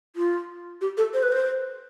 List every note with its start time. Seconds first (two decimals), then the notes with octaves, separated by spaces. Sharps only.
0.16 F4
0.81 G4
0.97 A4
1.14 C5
1.23 B4
1.32 C5